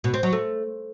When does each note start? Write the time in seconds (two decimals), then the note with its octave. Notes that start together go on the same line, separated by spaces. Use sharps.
0.04 B2
0.14 C4
0.23 F#3
0.33 A3